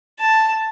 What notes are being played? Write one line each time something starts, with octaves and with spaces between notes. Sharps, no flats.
A5